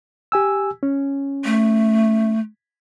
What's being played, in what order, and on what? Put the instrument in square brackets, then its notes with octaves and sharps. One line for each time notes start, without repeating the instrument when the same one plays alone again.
[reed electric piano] G4 G#5 E6
C#4
[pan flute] A3